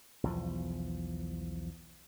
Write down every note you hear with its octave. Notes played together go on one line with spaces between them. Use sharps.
B1 E2 F3